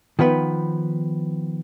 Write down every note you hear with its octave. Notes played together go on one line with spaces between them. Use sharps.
D#3 F3 B3 B4